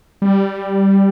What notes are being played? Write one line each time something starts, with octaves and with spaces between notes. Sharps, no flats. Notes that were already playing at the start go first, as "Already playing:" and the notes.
G3